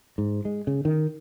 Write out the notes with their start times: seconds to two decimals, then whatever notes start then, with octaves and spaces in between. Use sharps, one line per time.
0.18 G#2
0.45 G#3
0.67 C#3
0.85 D#3